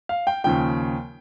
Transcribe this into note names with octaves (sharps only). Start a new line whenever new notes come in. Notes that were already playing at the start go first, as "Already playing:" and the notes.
F5
G5
D#2 C#3 F3 G5